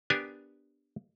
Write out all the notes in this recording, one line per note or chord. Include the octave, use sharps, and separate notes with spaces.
B3 D4 G4 A#4 G#5